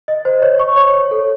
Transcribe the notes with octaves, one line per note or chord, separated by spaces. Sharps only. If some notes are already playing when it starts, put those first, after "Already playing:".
D#5
C5
C#5
C#6
C#5
C#5
A4